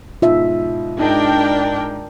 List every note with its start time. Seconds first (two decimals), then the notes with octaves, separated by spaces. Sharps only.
0.22 G#2 B2 F4 E5
0.99 G#2 D4 A#4 D#5 G5